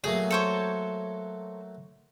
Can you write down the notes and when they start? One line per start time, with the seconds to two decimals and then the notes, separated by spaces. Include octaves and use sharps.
0.04 F#3 A3 A#3 G#4
0.30 A4 C5 C#5